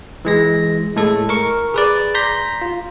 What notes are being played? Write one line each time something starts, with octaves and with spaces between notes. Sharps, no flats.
E3 G#3 A#6
A2 G#3 A4
A#4 C#6
G#4 B4 D5
A#5 C6 G6 A#6 B6
F4